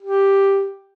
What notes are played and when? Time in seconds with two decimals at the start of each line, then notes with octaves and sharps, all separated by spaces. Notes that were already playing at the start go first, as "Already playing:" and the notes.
0.02 G4